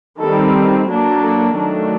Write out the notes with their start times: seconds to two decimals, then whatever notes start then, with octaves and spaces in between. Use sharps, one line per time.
0.20 D#3 G3 C4 A4
0.89 F#3 A#3 D4
1.23 A4
1.56 D#3 F#3 A3 D4